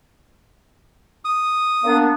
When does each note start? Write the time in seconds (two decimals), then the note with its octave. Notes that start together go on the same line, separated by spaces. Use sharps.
1.25 D#6
1.84 A#3 B3 D4